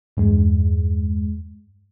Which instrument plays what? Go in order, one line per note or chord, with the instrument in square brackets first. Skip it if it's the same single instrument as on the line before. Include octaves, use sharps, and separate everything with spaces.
[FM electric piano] E2 G2 G#3